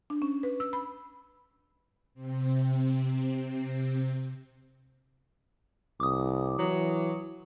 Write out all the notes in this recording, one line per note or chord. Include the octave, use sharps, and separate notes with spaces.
D4
C#4
B4
E6
B5
C3 C4
C2 D6 D#6
E3 F#3